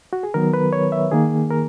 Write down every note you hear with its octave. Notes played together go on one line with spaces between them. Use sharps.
F#4
G#4
D#3 F#3 B3 A#4
B4
C#5
E5
D#3 A#3 G#4
A#4